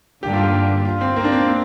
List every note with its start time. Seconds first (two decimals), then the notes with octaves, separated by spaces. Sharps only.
0.23 G2 D3 A#3 D4 G4
0.33 F4
0.43 G4
0.85 F4
1.01 C4
1.16 A#3
1.24 D4
1.32 C4
1.48 C4